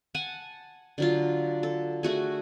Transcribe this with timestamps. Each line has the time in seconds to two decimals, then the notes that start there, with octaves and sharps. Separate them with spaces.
0.15 F#5 G#5 A5
0.98 D3 F#3 F4
1.63 A4
2.03 A3 F#4 G#4